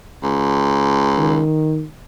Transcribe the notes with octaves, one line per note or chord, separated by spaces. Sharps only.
C#2
D#3